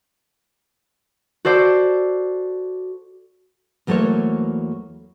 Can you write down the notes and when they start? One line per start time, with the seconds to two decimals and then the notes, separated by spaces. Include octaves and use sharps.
1.45 F#4 A4 C5 D5
3.87 E2 F#3 A3 A#3 C5 C#5